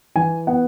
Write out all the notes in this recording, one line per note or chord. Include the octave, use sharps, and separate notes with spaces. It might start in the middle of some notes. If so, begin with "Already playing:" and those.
E3 G#5
B3 F#5